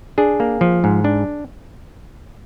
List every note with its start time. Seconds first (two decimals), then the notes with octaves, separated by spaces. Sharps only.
0.18 D4 G#4
0.40 A#3
0.61 F3
0.84 G#2
1.04 D4